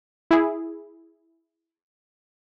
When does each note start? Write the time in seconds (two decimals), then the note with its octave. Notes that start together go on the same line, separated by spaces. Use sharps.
0.31 E4 G#4